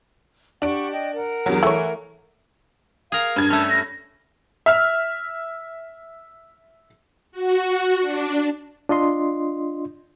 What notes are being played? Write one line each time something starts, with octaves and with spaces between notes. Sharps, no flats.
D4 G4 F#5 C#6 D7
D#5 G5
A#4 F#5
E2 G2 F#3
E3 A3 C#5
G#4 A#4 F5
G2 G#6
A3 C#4 A5
A#6
E5 F6
F#4
D4
D4 F4 D#5 C6